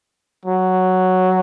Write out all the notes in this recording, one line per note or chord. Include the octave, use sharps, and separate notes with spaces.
F#3